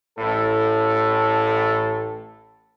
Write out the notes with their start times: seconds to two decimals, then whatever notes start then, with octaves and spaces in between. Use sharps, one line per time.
0.19 A1 A2 A4